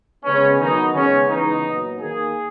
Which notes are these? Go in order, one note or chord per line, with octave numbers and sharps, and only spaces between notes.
C#3 G#3 B3 C#4
D#3 F#3 B3 D#4
C#3 G#3 B3 C#4
C#3 E3 G#3 B3 D#4
A#2 F#3 B3
D#3 A#3 G#4